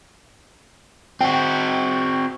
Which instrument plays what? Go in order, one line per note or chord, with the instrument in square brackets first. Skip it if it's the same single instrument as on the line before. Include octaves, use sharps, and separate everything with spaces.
[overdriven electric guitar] C4 F#4 [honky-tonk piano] G5